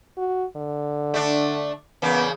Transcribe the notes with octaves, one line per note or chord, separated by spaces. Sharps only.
F#4
D3
A3 D4
E2 C#3 A#3 B3